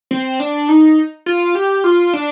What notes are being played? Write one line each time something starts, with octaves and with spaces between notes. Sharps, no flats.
C4
D4
D#4
F4
G4
F4
D4